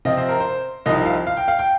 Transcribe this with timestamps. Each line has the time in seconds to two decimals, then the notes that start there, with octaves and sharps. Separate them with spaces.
0.05 C3 F3 C4 F4 D#5
0.17 C5
0.29 A#4
0.40 C5
0.86 C2 C3 F3 C4 D#4 D#5
1.06 F5
1.27 F5
1.37 G5
1.48 F5
1.59 G5